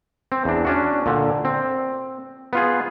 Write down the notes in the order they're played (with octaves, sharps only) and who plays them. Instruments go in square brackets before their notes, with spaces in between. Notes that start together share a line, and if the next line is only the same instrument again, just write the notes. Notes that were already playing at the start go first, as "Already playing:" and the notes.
[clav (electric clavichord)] C4
E2 D4
C#4 D4 F#4
A#2 D3
C4
B3 F4 G#4